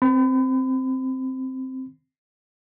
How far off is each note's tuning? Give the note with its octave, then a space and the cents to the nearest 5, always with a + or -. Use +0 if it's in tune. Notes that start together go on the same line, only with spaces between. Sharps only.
C4 +0 B5 +35